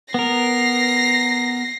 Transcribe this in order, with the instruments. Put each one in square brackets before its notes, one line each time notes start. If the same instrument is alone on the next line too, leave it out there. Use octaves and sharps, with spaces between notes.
[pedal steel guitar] B3 A#4 [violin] A#6 C7